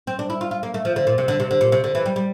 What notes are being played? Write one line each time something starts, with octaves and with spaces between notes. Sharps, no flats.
C4
D4
E4
F4
F4
A#3
A3
F3
D3
A#2
C3
D3
C3
D3
A#2
C3
D3
E3
G3
G3